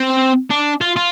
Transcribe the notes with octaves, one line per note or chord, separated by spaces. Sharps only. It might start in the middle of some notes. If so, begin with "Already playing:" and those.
Already playing: C4
D4
F4
F4